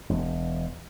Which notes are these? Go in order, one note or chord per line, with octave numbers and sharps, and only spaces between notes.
E1